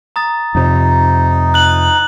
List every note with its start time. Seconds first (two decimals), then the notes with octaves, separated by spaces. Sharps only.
0.16 A#5 D#6 A6
0.55 F2 C3 D#4
1.54 F#6 F#7